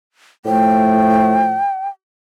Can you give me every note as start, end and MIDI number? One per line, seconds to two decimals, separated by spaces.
0.46 1.61 45
0.46 1.61 53
0.46 1.61 57
0.46 1.89 79